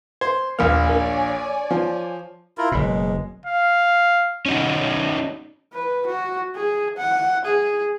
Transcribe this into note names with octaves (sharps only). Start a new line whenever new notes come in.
C5 G#6
A#1 D#2 A#3 C#5 D5 G#5 B5 F6
D4 A#4
F3
E4 F4 A#4
F#1 B2 G#3
F5
C#4 D#4 F#4
B4
F#4
G#4
F#5
G#4